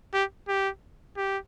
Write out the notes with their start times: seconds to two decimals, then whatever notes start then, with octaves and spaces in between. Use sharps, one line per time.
0.13 G4
0.48 G4
1.17 G4